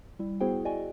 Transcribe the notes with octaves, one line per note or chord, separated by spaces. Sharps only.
G3 E4
B3 E4 F#4 G#4 C5 G5
F#4 D5 D#5 G5 G#5